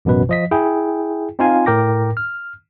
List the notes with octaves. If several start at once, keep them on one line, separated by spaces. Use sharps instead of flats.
A1 F#2 B2 B4
F3 D#5 B6
E4 G#4 G5
C4 D#4 F4 F5 G#5
A2 A#4 G5 D6 A#6
F6